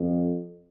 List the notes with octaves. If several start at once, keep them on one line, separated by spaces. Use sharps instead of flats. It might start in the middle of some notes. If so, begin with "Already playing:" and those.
Already playing: F2